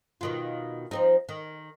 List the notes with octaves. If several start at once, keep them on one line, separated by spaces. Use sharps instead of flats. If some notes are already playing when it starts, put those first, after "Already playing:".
B2 D#3 F4
F3 C4 D#4
D#3